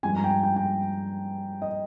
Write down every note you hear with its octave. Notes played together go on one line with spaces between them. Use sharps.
G2 F3 G#3 G#5
A#5
G5
G#5
G5
G5
D#5